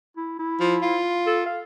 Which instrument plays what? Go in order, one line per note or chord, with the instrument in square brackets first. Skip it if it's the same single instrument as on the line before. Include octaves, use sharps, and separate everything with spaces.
[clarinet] E4
E4
[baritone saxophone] F3
F4
[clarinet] A4
F5